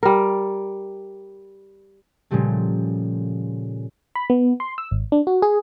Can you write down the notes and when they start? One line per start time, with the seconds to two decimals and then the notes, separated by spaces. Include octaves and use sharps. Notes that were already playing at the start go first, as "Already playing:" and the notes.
0.03 G3 A#4
2.31 A#2 C#3 F3 G3 A3
4.16 B5
4.30 B3
4.60 C6
4.78 E6
4.91 G#1
5.12 D4
5.27 F#4
5.42 G#4